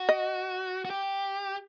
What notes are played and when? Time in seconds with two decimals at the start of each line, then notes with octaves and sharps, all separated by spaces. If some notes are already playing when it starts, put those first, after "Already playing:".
Already playing: F#4
0.09 D#5
0.85 F#4
0.90 G4